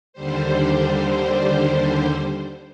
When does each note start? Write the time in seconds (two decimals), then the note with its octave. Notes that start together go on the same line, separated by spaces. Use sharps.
0.13 D#2 D3 G3 C5